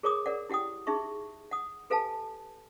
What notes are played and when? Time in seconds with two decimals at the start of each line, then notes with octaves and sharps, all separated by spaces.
0.03 G#4 A#4 C#5 A#5 D6 D#6
0.26 A#4 D5 F#5
0.49 E4 G4 F#5 G5 D#6
0.87 D#4 G#4 E5 C#6
1.51 F#5 D#6
1.90 G4 A4 B4 F5 G#5 A5